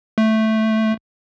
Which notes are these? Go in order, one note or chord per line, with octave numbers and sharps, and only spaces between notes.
A3